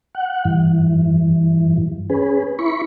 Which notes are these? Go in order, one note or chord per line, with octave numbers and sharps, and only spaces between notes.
F#5
G2 E3
C#4 G#4 B4
E4 B5 C#6